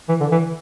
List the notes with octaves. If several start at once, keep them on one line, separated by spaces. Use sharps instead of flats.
E3
D3
E3